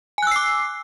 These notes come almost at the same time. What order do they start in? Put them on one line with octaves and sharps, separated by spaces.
G#5 F#6 E6 C7 D6